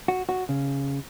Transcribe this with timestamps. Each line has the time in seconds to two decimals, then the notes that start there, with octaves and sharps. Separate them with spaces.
0.08 F#4
0.29 F#4
0.49 C#3